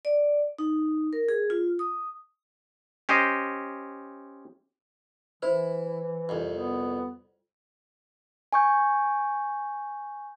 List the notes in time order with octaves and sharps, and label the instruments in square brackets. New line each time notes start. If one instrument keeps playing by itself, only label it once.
[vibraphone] D5
D#4
A#4
G#4
F4
D#6
[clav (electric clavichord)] C#4 G4 C5 D#5
[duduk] E3 [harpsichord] E4 [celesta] C5
[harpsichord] C2 F2
[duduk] B3
[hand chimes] G#5 C#6 G6